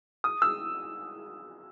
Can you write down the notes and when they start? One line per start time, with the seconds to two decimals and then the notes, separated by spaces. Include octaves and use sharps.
0.24 D#6
0.42 E6